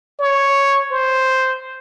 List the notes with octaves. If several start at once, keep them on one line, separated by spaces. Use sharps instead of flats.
C#5
C5